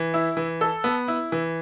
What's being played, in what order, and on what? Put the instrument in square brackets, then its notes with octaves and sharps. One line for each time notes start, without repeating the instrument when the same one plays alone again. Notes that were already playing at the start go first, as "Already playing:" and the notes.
Already playing: [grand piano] E3
E4
E3
A4
B3
E4
E3